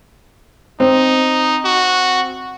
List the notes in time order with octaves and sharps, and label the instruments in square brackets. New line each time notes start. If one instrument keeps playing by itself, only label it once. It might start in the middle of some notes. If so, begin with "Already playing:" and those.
[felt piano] C4 C5 [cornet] D#4
[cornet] F#4